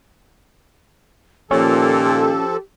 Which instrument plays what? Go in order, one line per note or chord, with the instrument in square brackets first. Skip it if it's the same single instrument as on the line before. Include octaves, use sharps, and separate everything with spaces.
[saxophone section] A#2 D#3 [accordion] F3 A4 [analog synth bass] C#4 [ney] G4